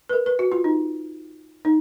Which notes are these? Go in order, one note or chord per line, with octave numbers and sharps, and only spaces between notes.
B4
A#4
B4
F#4
F4
D#4
D#4